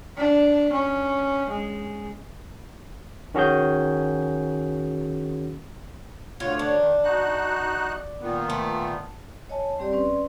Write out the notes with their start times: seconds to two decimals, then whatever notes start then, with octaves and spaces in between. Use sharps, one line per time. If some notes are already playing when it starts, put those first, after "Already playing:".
0.18 D4
0.73 C#4
1.50 G#3
3.34 D#3 C#4 F#4 G#4 G6
6.40 D2 D3 F4 C#5
6.59 D4
6.75 D#3
7.03 D#4 F#4 F#6
8.21 A#2 D#3 B3
8.50 A3
9.49 C#5 D#5 G#5 A5
9.79 G3 C4 G4 D5
9.92 C#4 B4 D5 C6